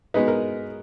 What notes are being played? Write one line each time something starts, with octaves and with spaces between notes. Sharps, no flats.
B2 G#3 B3 D#4 B4
A#4